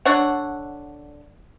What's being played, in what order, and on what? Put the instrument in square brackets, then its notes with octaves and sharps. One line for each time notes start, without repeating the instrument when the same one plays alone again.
[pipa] D3 D4 C#5 F#5